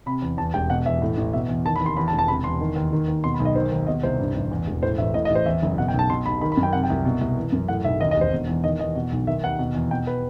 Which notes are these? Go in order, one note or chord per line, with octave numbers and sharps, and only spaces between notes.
C3 B5
E2
E2 A5
E1 G5
B2 F#5
E2 E5
A2
A1
B2 E5
E2
D#3 A5
B5
D#2
C6
E2 B5
A5
E1
A5
C3 B5
E2 C6
D#3
D#2
D#3
D#2
B2 C6
B5
B1
D#5
D#3 C5
D#2
B2 D#5
C2 C5
G2
A1
E2
E1
A2 C5
A1 E5
A2 D#5
D#5
A1
C5
E2 E5
F#1
B2 F#5
G5
B1
A5
B2 C6
B1 B5
D#3 B5
B5
F#2
G5
C3 F#5
G5
C2
B2
C2
E3
F#2
A2 F#5
B1 E5
D#2 D#5
D#5
E1 C5
B2
E2
D#3 D#5
E2 D#5
B2
B1
D#3 E5
D#2 F#5
B2
E2
B2 G5
B4